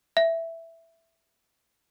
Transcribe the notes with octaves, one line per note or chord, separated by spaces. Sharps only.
E5